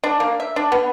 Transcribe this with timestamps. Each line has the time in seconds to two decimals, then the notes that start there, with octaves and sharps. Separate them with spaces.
0.04 D4
0.20 A#3
0.40 E5
0.56 D4
0.72 B3